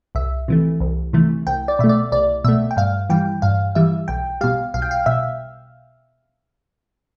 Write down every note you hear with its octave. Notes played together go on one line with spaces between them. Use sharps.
C2 E5
C3 E3 A3
C2
C3 E3 A3
C2 G5
D5
B2 A3 E5
D5
C2 D5
B2 A3 E5
G5
G2 F5
E3 G3 G5
G2 F5
E3 G3 E5
B1 G5
B2 G3 F5
B1 F5
G5
F5
B2 E5